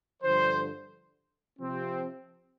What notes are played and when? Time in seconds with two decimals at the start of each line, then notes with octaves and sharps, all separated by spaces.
0.23 G2 D3 F3 C5
1.59 C3 F3 C4